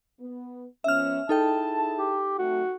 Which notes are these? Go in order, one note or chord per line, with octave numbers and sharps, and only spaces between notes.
B3
F3 B3 C#4 E5 F6
D#4 E4 G#4 A4 G5 A5
G4
C3 F#3 A3 F#4